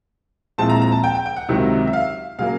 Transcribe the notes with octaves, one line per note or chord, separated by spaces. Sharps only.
A#2 F3 G#3 C4 E4 A5
A#5
A#5
A5
G5
G5
G5
F#5
C#2 C3 D#3 F#3
E5
F5
C#3 F#3 A#3 F5